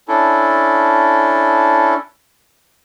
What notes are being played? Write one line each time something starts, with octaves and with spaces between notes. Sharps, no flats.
C#4 D4 E4 A4